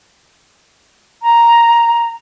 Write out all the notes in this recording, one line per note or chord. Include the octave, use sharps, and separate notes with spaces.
A#5